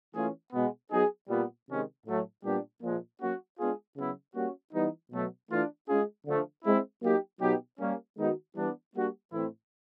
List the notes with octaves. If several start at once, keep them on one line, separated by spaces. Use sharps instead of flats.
E3 A3 C#4 F4 G#4
B2 G#3 B3
F#3 B3 D#4 G#4
A#2 G3 B3
C3 D#3 G#3 C#4
A2 F#3 A3
A#2 G3 B3 D4 G4
A#2 F3 G#3
F#3 A#3 C#4 F#4
G#3 B3 D4 F4 G#4
C#3 F#3 B3 E4
G3 A#3 C#4 F#4
E3 G3 B3 D#4
B2 F#3 A3
E3 A3 D4 F4
G#3 C#4 F4 G#4
D3 F3 A3
G#3 C4 E4
F#3 A#3 D#4 G4
B2 F#3 B3 D#4 G4
G3 A#3 C#4
D#3 G#3 B3 D#4 F#4
E3 G3 B3 D4
G3 A#3 D4 F#4
A2 E3 A3 C4 E4